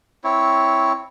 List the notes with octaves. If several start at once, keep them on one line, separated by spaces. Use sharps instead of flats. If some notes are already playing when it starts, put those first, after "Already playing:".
C4 E4 C#5